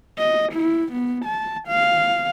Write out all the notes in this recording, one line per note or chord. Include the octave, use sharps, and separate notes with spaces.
D#5
E4
B3
A5
F5